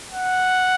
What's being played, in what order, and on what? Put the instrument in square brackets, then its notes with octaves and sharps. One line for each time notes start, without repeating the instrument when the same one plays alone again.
[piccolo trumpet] F#5